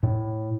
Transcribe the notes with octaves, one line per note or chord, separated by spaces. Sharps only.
A2